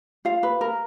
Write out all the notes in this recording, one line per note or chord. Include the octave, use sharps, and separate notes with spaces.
F4 F5
B4
A#4